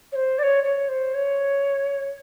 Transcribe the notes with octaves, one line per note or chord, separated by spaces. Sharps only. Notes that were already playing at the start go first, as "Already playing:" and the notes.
C#5
C5
D5
C#5
C#5
C5
C#5